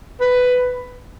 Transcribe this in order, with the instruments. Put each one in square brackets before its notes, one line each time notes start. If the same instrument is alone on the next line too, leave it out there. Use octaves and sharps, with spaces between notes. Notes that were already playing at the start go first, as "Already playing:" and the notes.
[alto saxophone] B4